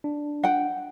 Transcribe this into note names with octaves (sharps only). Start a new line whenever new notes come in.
D4
F#5 G5